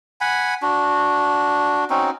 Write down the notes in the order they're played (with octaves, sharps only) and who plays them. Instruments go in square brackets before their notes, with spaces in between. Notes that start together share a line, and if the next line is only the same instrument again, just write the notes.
[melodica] F#5 G#5 B5
D4 F#4
C4 C#4 D#4 F#4